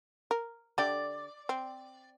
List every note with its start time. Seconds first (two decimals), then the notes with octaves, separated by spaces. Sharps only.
0.31 A#4
0.78 D3 G4 D5
1.49 C4